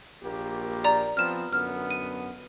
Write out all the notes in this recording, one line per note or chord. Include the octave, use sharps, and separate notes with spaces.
A#1 A#3 G4
D5 A#5
F3 B3 C4 F6 E7
F#2 D3 B3 F6
D#7